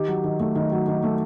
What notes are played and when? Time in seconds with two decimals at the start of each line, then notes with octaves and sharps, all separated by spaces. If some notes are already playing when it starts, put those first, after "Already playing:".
Already playing: D#3 G4
0.08 F#3
0.24 D#3
0.40 A3
0.56 D#3
0.72 F#3
0.88 D#3
1.04 A3